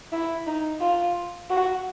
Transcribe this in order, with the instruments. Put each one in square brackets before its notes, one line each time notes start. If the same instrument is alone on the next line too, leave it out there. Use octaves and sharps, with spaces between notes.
[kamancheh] E4
D#4
F4
F#4